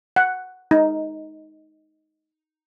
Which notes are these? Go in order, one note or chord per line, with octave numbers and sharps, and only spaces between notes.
F#5
D#4